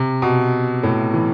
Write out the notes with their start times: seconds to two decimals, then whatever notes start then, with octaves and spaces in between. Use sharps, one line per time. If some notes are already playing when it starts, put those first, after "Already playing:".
Already playing: C3
0.22 B2
0.83 A2
1.14 E3